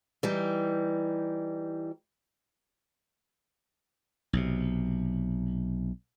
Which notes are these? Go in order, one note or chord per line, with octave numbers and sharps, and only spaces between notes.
E3 G3 D#4
B1 C3